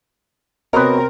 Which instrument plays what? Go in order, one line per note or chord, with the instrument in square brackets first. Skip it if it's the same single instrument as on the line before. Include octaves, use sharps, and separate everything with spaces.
[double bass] C3 C4 [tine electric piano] B3 F#4 C#5 [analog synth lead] A#4 [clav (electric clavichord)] B4 D#5